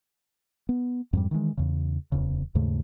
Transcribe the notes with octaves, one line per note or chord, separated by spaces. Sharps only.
B3
F2 G#2 G3
D#3 E3 F#3 G#3
E2 C#3
D1 E2 C#3
D#2 G#2 C#3 A3